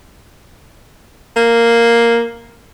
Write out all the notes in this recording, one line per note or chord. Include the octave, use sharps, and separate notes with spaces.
A#3